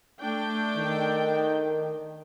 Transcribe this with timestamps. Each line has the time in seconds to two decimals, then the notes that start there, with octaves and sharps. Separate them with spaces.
0.20 A3 D4 G5
0.77 D#3